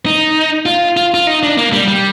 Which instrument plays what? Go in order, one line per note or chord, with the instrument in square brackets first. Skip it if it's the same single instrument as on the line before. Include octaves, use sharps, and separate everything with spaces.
[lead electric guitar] D#4
F4
F4
F4
D#4
D4
A#3
G3
G3